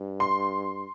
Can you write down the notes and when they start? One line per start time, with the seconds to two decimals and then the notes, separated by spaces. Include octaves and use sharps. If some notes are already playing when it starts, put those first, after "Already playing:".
Already playing: G2
0.20 C6